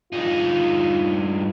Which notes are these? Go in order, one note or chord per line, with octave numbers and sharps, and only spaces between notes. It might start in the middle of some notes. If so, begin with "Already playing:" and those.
G2 D#4 F4